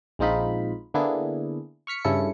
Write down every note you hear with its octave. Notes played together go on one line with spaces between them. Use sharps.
A#1 G#3 C4 D#4 F4 B5
D3 A#3 B3 D4 E4 G#4
C#6 F6 B6 C#7
G2 C#3 C#4 E4 A4 C#7